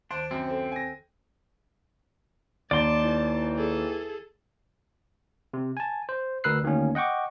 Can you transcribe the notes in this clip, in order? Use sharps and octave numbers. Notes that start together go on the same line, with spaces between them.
D2 D#3 D4 C5
F#2 C4
A4 C5
G#5 A#6
D#2 D5 A5 C6
E3
G#4 A4
C3
G#5 A5
C5
D2 A#4 B4 E6 F#6 C7
D2 D#3 A#3 C#4
D#5 F#5 G5 C#6 D6